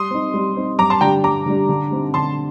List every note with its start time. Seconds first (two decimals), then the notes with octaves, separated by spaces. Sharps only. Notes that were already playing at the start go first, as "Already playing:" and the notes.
Already playing: G3 C6 D#6
0.11 C4 D#4
0.34 G3
0.57 C4 D#4
0.79 G2 A#5 D6
0.90 A5 C6
1.01 D3 G3 D4 G4 G5 A#5
1.24 G2 A#5 D6
1.46 D3 G3 D4 G4
1.69 D3
1.91 G3 C4 D#4
2.14 D3 A5 C6